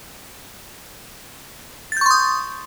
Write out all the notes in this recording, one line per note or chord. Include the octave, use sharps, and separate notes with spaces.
C6 C#6 D#6 G6 A6